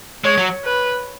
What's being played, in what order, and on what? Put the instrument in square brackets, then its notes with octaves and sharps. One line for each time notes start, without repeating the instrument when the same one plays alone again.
[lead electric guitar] G#3 [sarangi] C#5
[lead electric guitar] F#3
[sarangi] B4